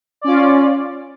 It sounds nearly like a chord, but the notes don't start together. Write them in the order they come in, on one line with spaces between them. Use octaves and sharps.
D5 C#4 F4